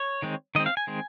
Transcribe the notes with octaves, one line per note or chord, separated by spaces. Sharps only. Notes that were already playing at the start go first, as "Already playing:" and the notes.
Already playing: C#5
D#3 G#3 C4
D#3 G#3 C4 D#5
F5
G#5
D#3 G#3 C4